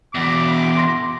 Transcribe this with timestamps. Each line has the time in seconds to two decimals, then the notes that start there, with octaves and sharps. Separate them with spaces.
0.15 E2 B2 D6
0.77 C6 A#6